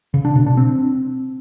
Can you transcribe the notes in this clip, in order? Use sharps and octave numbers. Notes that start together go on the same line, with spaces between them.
C#3
D4
B2
D4
C4